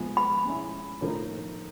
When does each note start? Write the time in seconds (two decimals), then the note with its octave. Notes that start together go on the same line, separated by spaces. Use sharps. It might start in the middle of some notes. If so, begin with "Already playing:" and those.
Already playing: F3 G#3 B3
0.17 B5
0.45 G#3 C#4 E4
1.01 A2 F3 A#3 D#4